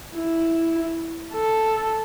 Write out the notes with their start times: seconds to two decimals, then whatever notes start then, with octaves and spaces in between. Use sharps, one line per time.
0.16 E4
1.34 A4